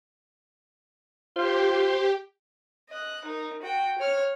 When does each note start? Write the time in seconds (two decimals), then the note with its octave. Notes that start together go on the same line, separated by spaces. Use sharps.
1.36 F4 G4 C5 C6
2.90 D#5 F#6
3.25 D#4 A#4
3.62 F#4 G5
3.98 C#5 F6